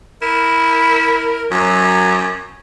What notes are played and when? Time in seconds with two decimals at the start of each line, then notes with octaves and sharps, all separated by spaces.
0.22 E4 A#4
1.51 F#2 F#3